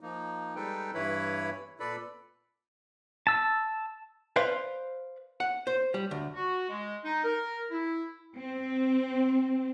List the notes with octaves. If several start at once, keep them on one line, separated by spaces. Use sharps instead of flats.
F3 A#3 D#4
G3 G#3 D#4 A4 B4 G5
G2 E3 E4 B4 C#5 B5
A#2 A4 B4 D5 B5
A5 E6
B4 C5 D5 F5
F#5
C5
G3
D2
F#4
G#3
D#4
A#4
E4
C4